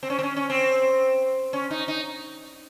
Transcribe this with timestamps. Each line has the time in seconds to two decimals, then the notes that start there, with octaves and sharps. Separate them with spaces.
0.03 C4
0.10 C#4
0.19 C4
0.23 C#4
0.36 C#4
0.50 C4
1.53 C#4
1.71 D#4
1.88 D#4